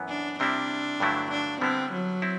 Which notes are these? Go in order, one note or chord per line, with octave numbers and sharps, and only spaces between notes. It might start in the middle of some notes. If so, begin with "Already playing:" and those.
Already playing: F#2 E3 B3
D4
C3 G3 C4 D4 E4
G2 D3 F#3 A3 E4
D4
D3 G3 B3 C4 E4
F#3
C4 E4